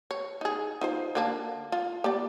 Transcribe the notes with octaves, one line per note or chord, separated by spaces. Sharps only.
C#5
D#4 G#4
D#4 F4 C5
D3 A#3 D4
F4
A#3 G4 D5